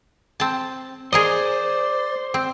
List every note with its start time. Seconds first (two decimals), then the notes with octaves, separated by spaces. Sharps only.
0.40 C4 A5
1.13 G#4 A#4 C5 D5 D#5
2.34 C4 E6